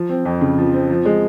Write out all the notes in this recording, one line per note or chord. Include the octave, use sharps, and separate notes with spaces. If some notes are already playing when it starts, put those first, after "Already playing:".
Already playing: F3
C4
F2
C#3
F3
C4
F3
G#3